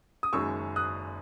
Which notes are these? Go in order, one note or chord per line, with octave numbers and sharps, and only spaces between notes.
D#6
F#1 F#2 D#3 G#3 C#6 E6
D#6 F#6